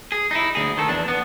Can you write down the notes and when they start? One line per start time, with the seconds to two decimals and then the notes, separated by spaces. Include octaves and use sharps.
0.12 G#4
0.31 D#4 E4
0.55 D2 G#4
0.77 D#3 A4
0.89 E2 D4
1.08 B3